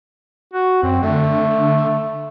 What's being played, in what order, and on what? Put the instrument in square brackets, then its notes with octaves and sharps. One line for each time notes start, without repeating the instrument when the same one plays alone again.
[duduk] F#4
[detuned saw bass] F#2 [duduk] C4
[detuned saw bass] D3 [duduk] A3